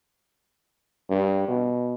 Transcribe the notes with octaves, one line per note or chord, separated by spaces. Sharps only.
G2
B2